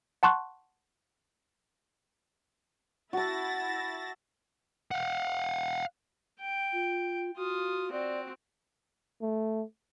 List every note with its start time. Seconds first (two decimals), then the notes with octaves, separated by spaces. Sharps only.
0.23 F#5 A5 C6 C#6 F#6
3.13 E4 F#4 A5 A6 A#6
4.91 F5 F#5
6.40 G5
6.73 F4
7.37 F4 F#4 D#6
7.92 C4 F#4 D5
9.22 A3